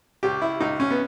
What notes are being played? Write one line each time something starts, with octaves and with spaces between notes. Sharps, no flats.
C#2 G4
E4
C#2 D#4
C#4
B3